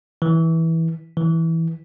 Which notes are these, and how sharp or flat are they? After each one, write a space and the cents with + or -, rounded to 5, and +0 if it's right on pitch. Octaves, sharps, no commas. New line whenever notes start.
E3 -15
E3 -10